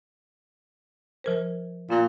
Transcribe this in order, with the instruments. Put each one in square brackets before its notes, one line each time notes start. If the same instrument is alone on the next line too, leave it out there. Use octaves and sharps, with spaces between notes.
[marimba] F3 A#4 C5
[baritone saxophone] A#2 [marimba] A#3 F4